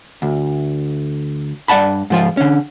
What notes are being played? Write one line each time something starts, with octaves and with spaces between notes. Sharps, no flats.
D2
G2 D5 F#5 A5 B5
G#2 F3 F4
D3 C#4